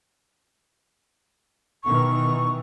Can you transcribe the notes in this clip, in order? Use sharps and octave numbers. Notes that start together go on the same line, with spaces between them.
B2 D#3 E3 C#6